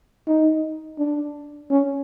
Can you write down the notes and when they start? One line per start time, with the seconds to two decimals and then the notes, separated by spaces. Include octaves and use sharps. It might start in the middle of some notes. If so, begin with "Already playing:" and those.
0.27 D#4
0.98 D4
1.70 C#4